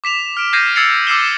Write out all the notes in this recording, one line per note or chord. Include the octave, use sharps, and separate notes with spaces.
D6 B6 E7 F7
F6 D7
F6 G6 G#6 A#6 C7 D#7
E6 G#6 A6 C7 C#7 F7
D6 E6 F6 C7 E7 G7